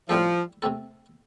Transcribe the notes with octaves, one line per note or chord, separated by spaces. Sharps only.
A2 F3 G3 C4 A4
C3 A3 C4 A4